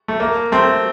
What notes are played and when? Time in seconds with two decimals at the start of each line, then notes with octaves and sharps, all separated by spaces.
0.08 A3
0.20 A#3
0.52 A3 C4